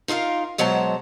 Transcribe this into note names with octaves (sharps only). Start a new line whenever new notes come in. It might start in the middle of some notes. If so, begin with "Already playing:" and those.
D#4 F4 G#4 A#4 F5
B2 F#3 G#3 C5 A5 A#5